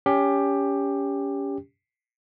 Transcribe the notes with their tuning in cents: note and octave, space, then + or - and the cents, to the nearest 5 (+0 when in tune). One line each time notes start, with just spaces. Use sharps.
C#4 +25 G4 +15